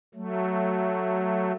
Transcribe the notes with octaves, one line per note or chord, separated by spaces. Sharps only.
F#3 A3